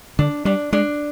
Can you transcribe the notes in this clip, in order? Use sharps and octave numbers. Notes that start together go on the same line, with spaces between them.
D3 D4
G3 D4
G#3 D4